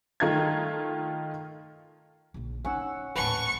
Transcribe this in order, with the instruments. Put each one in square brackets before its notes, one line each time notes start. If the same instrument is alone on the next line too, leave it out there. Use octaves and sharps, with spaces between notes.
[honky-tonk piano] D#3 A3 F4 A#5 G#6
[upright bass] A#1 C#3
[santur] C#4 F#5 E6 [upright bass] D#4
[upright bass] D#1 A1 [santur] B4 F#5 A5 [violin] C#6